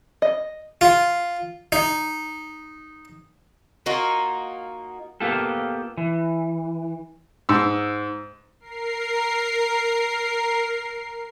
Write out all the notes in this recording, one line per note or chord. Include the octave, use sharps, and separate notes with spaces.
D#5
F4
D#4
A#3 D#4 F4 F#4
A#3 B3 F4 G4 A4
E3
G#2 E6
A#4 C7